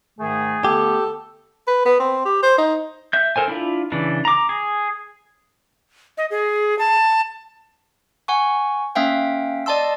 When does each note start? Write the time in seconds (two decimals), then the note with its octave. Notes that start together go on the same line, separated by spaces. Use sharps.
0.19 G#2 D#3 A3 G#4
0.65 D3 A3 B3 G4 A4
1.68 B4
1.86 B3
2.00 C4
2.25 G4
2.43 C5
2.58 D#4
3.13 E5 G6
3.36 A4 A#4 C5 G#5
3.48 D4 E4 F4
3.92 C#3 E3 D4
4.25 A#5 D6
4.49 G#4
6.17 D#5
6.30 G#4
6.79 A5
8.28 F#5 G#5 C#6
8.95 A#3 C#4 E5 F5 G5
9.66 D5 D#5 A5 C6 E6